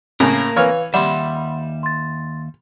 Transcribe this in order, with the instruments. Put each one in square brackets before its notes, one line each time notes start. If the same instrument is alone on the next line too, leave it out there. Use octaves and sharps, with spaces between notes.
[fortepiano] A2 C#3 [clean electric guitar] A#3 A#4 [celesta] A5
[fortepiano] E3 C#5 F6 [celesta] B4 F5
[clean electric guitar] D#2 E5 [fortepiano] G3 [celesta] F#5 B5 C6
[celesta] C6 A6